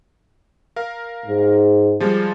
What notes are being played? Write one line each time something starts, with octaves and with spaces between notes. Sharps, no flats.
A#4 F5
G#2
F3 G3 G#3